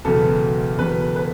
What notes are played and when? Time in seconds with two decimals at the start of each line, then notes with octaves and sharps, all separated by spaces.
0.05 E1 E2 C#3 F#3 B3 A4
0.79 E1 E2 C#3 F#3 B3 B4
1.16 B4